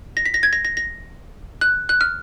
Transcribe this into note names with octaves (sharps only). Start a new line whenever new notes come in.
A#6
B6
A#6
G#6
A#6
A#6
A#6
F#6
F#6
F6